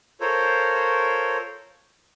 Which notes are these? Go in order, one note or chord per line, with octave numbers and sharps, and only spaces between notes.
F4 A4 A#4 C5 C#5